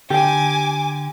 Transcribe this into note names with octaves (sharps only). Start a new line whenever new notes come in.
D3 G4 G5 G#5 D6